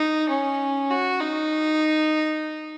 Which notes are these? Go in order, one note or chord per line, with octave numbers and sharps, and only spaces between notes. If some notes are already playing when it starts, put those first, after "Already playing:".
Already playing: D#4
C#4
F#4
D#4